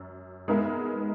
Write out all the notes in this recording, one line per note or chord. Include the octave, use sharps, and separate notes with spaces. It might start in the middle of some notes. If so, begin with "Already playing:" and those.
Already playing: F#2
G#3 B3 D#4 A#4 E5